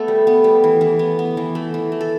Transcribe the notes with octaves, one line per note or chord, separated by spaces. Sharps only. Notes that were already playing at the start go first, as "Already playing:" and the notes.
Already playing: A3 B3 A4
G3
B3
G3
E3
E3
B3
B3
E3
A3
E3
A3
A4